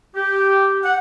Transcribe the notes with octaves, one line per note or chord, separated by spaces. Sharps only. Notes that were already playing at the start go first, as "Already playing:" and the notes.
G4
F#5